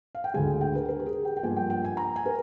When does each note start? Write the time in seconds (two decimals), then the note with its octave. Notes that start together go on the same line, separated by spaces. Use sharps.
0.15 F5
0.24 G5
0.34 D2 D3 G#3 G#5
0.61 G5
0.75 A#4
0.89 A#4
1.00 G4
1.06 G#4
1.25 G5
1.37 G5
1.43 G2 F3 A#3 G#5
1.57 G5
1.70 G5
1.85 G#5
1.97 A#5
2.16 G#5
2.26 A#4